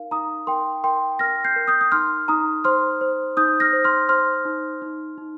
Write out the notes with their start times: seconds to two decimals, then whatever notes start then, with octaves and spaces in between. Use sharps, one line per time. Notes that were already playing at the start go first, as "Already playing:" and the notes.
Already playing: D#4 A#4 F5
0.11 D#4 A#5 D#6
0.47 A#4 G5 C6
0.84 A#4 G5 C6
1.19 A#4 F6 A#6
1.45 G6 C7
1.56 A#4
1.68 D#6 G6
1.81 D#6
1.92 D#4 C6 F6
2.28 D#4 A#5 D#6
2.64 C5 C6 F6
3.01 C5
3.37 D#4 D#6 G6
3.60 F6 A#6
3.73 C5
3.84 C6 F6
4.09 C5 C6 F6
4.45 D#4
4.82 D#4
5.18 D#4